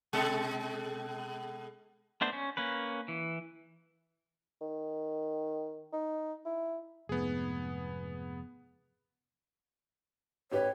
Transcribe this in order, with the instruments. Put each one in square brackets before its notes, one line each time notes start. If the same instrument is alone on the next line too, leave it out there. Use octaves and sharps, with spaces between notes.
[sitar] B2 G#3 A4
[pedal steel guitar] A3 B3 D4 C5
C#4
A#3 C#4 B4
E3
[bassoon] D#3
D#4
E4
[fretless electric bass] F1 G#2 [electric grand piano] B3 G#4
[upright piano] A1 G4 B4 [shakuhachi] C#5